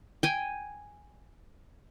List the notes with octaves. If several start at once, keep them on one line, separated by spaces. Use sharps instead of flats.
G5 G#5